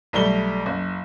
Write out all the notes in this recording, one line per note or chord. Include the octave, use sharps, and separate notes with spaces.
B1 G3 A3 G7
F#1